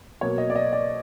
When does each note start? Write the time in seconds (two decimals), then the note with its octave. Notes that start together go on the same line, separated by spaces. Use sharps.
0.21 B2 F#3 A#3 C#5
0.38 D#5
0.50 D5
0.56 D#5
0.73 D5